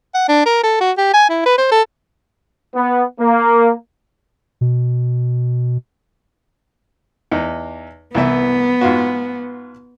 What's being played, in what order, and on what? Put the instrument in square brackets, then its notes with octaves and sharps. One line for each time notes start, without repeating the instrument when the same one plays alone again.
[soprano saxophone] F#5
D4
A#4
A4
F#4
G4
G#5
E4
B4
C5
A4
[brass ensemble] B3
A#3
[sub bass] B2
[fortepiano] E2 D#4
[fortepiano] C2 E3 E5 [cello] B3
[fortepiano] G#2 F4 F#4